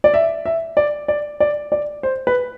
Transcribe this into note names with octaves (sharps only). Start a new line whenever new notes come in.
D5
E5
E5
D5
D5
D5
D5
C5
B4